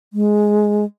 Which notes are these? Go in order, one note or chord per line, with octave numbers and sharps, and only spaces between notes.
G#3